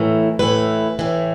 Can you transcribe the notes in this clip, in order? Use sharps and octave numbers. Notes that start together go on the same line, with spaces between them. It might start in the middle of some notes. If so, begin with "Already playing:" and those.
Already playing: A2 E3 A#4
A2 E3 B4
A2 E3